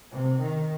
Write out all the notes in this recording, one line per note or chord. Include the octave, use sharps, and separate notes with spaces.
C3
D#3